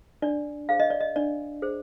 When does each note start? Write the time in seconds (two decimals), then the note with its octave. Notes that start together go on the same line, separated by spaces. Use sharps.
0.22 D4 D5
0.69 G#4 C5 F5
0.80 D#5
0.90 D5
1.01 D#5
1.16 D4 D5
1.62 G#4 C5